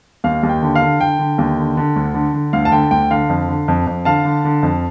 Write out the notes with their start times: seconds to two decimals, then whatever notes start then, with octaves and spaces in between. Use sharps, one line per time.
0.24 D#2 F5
0.43 D#2
0.49 G5
0.62 D3
0.75 F5
0.81 D3
1.00 D3 G5
1.19 D3
1.38 D#2
1.58 D3
1.77 D3
1.96 D2
2.14 D3
2.33 D3
2.53 D2 F5
2.65 A5
2.72 D3 G5
2.91 D2 G5
3.11 D3 F5
3.29 F2
3.48 D3
3.68 F2
3.87 F2
4.05 D3 F5 A5
4.25 D3
4.45 D3
4.63 F2